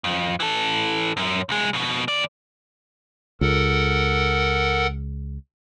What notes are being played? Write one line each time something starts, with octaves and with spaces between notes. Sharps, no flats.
F2
E3 A4
F#2
C2 G#3
F2 B2
D#2 D5
C#2 A4 A#4 F#5